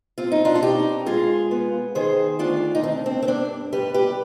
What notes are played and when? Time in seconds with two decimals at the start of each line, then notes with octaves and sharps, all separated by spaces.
0.18 C4 F4
0.32 D#4
0.45 D4 F4
0.55 F4
0.62 B2 D#4 G4
1.06 G#3 F4 G#4
1.51 B3
1.95 D#3 G#4 C5
2.39 D2 D4 F4
2.75 D#4
2.83 C4 D4
3.06 C4
3.22 C4
3.28 G2 D4
3.72 G3 G4 B4
3.94 G4 B4